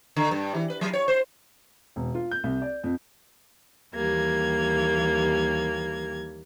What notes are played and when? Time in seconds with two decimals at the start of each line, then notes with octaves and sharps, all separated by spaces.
0.16 D3
0.31 G2
0.55 E3
0.70 B4
0.81 F#3
0.93 C#5
1.08 C5
1.96 E1
2.15 F4
2.31 G6
2.44 C2
2.62 D5
2.84 F2
3.94 D#2 E3 G3 A#3 G#6